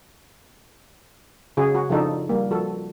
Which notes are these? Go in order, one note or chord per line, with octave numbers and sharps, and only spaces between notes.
C#3 F#4 G#4
F#4
C#3 F3 D4 D#4 A4
G3 A#3
F3 F#4 A4